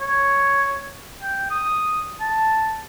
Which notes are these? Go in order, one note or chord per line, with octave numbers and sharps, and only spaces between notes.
C#5
G5
D#6
A5